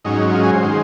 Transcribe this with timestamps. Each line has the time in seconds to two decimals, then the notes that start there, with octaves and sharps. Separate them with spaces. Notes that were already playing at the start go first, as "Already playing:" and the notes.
0.05 G#2 F#3 C#4 D#4
0.29 D#4
0.33 F4
0.43 G#4
0.53 C5
0.63 D#3 G#3